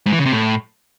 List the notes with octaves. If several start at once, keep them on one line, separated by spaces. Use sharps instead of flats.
G#2
E3
C#3
C3
A2